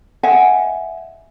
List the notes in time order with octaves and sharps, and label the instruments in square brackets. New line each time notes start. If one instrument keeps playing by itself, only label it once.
[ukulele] D#5 E5 F#5 G#5